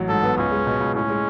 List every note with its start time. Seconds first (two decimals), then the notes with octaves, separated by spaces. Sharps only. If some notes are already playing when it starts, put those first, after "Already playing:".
Already playing: A1 F#3
0.09 G#2 A4
0.23 B3
0.37 C#2 C#4
0.51 G#3
0.67 B2
0.80 C#2
0.95 A2 C#4
1.10 G#3